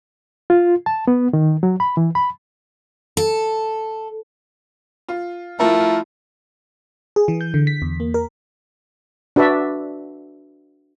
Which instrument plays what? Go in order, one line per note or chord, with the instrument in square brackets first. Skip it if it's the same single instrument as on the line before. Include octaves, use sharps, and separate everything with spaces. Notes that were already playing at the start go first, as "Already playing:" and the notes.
[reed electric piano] F4
A5
B3
D#3
F#3
B5
E3
B5
[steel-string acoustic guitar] A4
[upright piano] F4
[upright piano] F3 A#4 [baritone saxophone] A3 [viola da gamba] E4 F4
[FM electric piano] G#4
E3
G6
D3
B6
E2
A#3
A#4
[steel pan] D4 F#4 B4 D5 E5